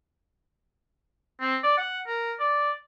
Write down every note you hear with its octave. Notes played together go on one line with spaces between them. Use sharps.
C4
D5
F#5
A#4
D5